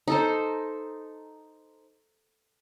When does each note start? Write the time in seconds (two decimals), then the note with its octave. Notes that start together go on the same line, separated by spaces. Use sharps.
0.08 D#4 A4 C5